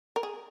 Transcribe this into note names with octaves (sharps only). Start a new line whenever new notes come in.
A#4
G#4